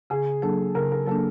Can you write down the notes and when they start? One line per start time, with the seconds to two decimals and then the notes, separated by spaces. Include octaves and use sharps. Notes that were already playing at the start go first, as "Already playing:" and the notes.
0.10 C#3 G#4
0.42 F#3 A#3 D4 A4
0.75 C#3 A#4
0.92 A#4
1.07 F#3 A#3 D4 A4